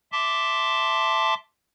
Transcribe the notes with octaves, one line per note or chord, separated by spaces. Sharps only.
E5 A5 C6 D6